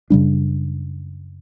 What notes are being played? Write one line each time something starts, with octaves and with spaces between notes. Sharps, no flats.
F#2 C#3 G3 D4